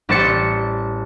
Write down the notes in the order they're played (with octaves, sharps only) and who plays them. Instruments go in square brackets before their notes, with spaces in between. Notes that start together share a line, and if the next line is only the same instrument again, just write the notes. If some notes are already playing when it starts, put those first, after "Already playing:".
[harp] A1 G3 C5 A6 C#7